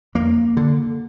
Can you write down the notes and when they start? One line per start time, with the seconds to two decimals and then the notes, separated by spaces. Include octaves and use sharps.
0.15 F2 A#3
0.57 D3